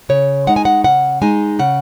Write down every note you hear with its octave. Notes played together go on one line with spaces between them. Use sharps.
C#3 C#5
G#3 D#4 F#5
G#5
F#5
C#3 F#5
G#3 D#4 G#5
C#3 F#5